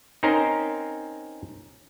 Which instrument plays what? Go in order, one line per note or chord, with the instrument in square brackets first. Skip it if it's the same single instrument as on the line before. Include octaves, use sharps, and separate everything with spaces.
[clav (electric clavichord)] C4 C#4 D#4 A#4 C5